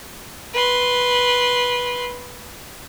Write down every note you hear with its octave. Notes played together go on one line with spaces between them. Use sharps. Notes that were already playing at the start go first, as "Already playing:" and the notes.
B4 C6